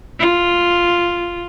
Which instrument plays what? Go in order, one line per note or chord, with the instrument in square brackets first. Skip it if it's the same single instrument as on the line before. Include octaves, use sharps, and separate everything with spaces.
[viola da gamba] F4